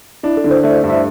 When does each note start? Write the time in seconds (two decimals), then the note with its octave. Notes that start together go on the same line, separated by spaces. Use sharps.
0.23 D4 E4
0.37 A4
0.44 D3
0.51 C5
0.64 A3 D5
0.77 E5
0.84 G2
0.90 E5